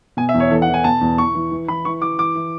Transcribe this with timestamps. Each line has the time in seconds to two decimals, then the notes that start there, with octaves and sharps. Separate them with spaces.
0.17 B2 G#5
0.29 E5
0.34 E2
0.40 C#5
0.51 E3 A4
0.62 F#5
0.68 E3
0.74 G#5
0.84 B2 A5
1.01 E2
1.18 E3 C#6
1.35 E3
1.52 E3
1.68 E3 B5
1.85 E3 C#6
2.02 E3 D6
2.19 E3 D6
2.35 E3